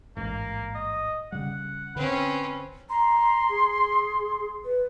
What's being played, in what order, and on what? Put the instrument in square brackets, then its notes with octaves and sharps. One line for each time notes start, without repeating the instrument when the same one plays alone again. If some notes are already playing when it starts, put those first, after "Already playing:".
[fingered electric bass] A1 G#2 [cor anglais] A#3
[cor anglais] D#5
[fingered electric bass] C#3 G3 [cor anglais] F#5
[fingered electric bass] D3 [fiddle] C4 C#4 [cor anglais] B4
[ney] A#5 [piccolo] C6
[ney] G#4
B4